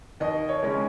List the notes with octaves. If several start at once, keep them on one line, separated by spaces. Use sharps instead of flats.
D#2 D#5
C#5
C#3 G#3 C#4